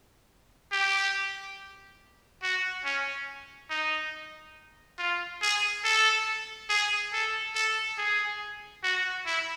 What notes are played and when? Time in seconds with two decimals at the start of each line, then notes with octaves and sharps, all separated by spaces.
0.72 G4
2.43 F#4
2.85 C#4
3.70 D#4
4.99 F4
5.42 G#4
5.84 A4
6.69 G#4
7.13 A4
7.55 A4
7.98 G#4
8.84 F#4
9.26 E4